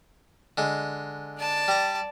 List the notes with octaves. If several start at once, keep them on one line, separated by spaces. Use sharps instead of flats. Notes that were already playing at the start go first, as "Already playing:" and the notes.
D3 G#3
D5 A5
G3 A#5